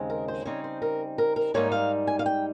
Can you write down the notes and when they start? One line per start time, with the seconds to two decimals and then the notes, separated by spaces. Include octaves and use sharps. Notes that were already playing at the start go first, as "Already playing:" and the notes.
Already playing: D#2 C#3 G#3 C4 D#4
0.10 A#4
0.28 C5
0.45 C#3 G3 C4 D#4 C#5
0.64 C5
0.82 A#4
1.18 A#4
1.36 A#4
1.54 G#2 G3 A#3 D#4 C#5
1.72 F5
2.07 G#5
2.19 F5
2.26 G5